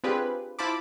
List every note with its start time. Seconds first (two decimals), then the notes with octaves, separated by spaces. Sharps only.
0.04 C4 D4 F4 G4 G#4 B4
0.59 E4 F4 C5 A5 B5 D6